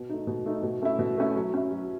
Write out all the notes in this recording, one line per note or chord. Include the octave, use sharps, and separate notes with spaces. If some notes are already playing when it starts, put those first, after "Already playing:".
Already playing: B2
A3 D#4
B2
A3 D#4
B2
A3 C#4 E4
B2
A3 C#4 E4
F#3
C#4 E4
F#3